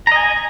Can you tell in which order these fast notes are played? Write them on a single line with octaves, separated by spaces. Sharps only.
A#5 D#5 G#5